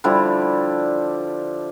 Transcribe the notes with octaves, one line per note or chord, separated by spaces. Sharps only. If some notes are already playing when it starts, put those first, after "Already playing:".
D3 F3 G3 E4